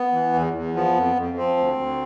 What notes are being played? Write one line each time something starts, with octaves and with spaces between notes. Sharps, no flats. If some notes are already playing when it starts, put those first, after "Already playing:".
Already playing: B3
E3
E2
E2
F3 B3
F2
F2
F3 C4
D2
D2